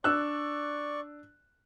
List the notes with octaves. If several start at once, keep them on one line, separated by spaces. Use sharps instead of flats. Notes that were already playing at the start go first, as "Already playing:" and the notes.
D4 D5 C#6 E6 F#6